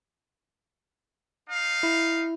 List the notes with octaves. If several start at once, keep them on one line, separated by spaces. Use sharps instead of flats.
D#4 F5
E4